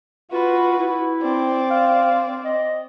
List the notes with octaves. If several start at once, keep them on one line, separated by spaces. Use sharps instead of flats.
F4 F#4 B4
E4
C4 D5
F5
D#5